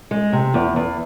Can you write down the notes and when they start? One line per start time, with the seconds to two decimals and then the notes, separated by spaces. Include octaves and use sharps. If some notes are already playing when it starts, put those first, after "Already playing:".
0.11 G#3
0.33 C3
0.54 E2
0.76 E2